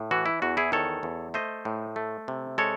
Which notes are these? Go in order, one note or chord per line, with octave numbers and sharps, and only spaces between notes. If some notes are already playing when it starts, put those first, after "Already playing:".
Already playing: A2
E3 F#4
E4
E2 F#4
E4 G#4
D#3 A4 C#5
E2
A3 C5 D#5
A2
A3
C3
G#3 A4 C#5